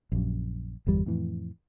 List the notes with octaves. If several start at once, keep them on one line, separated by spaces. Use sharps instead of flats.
A#1 F#2
G1 E2 G3
F2 A2 E3